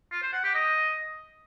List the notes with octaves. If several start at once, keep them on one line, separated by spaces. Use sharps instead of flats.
F4
C5
F#5
G4
D#5